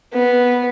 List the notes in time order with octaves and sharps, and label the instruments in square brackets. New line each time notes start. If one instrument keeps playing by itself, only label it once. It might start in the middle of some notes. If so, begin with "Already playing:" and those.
[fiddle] B3